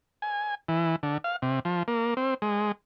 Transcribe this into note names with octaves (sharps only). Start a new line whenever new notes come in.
G#5
E3
D3
F5
C3
F3
A#3
C4
G#3